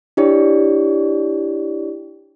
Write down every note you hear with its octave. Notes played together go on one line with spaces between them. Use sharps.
D4 E4 G4 C#5 D5